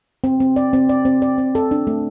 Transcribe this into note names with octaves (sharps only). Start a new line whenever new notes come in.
C4
C4
D5
C4
D5
C4
D5
C4
A4
D4
A3